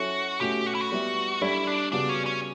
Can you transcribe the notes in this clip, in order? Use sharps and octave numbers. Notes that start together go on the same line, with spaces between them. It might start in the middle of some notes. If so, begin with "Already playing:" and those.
Already playing: F#3 C#4 E4 F#4 A4 C#5
B2 A3 C#4 F#4 G4
F#4
E4
F#4
G3 B3 E4
G3 D4 E4 A4 D5
D4
C#3 G3 B3 D4 F#4
C#4
C#4